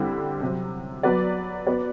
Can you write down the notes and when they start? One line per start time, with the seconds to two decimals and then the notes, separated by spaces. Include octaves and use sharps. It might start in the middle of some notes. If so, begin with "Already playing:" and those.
Already playing: D3 G3 C4 E4 G4
0.41 C3 F#3 C4
1.03 F#3 B3 F#4 B4 D5
1.67 B3 F#4 B4 D5